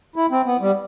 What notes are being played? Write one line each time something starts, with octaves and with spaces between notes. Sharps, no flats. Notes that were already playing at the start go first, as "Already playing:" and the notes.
E4
C4
B3
G3